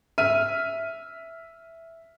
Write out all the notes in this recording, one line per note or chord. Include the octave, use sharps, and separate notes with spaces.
E5 F6 D#7